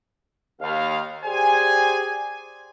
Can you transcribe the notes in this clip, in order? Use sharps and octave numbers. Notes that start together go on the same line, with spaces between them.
D#2 F5
G4 G#4 C5 D5 G#5